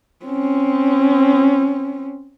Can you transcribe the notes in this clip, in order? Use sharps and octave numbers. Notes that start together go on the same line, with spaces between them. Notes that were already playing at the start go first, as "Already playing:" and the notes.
C4 C#4